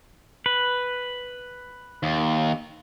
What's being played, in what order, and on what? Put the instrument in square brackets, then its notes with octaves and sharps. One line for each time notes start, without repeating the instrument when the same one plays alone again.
[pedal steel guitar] B4
[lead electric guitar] D#2